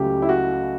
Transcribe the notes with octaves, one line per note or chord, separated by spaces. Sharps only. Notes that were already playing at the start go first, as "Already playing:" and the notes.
Already playing: C#2 C#3 F#3 A3 G4
E4
F#4